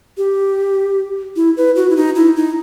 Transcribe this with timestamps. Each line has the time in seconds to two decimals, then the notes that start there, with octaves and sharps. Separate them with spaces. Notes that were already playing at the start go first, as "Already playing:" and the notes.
0.17 G4
1.36 E4
1.57 B4
1.76 F#4
1.90 E4
1.96 D#4
2.15 E4
2.36 D#4